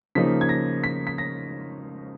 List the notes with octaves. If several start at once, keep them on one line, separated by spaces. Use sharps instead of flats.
C#3 F3 A#3 D#4 B6
G#6
A#6
B6
B6
A#6